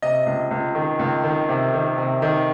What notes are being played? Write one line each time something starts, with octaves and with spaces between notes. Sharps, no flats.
C3 D#5
C#2
C#2
D#3
C#2
D#3
C3
D#3
C3
D#3